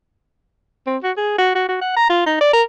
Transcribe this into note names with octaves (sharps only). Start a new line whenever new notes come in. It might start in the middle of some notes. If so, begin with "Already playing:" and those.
C4
F#4
G#4
F#4
F#4
F#4
F#5
A#5
F4
D#4
D5
A#4